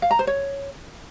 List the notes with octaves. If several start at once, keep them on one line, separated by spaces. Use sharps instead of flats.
F5
A#5
C5
C#5